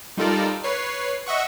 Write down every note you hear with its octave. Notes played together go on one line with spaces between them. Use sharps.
G3 D#4 F4 A4 A#4 D5
B4 C#5 C7
D#5 E5 F#5 C#6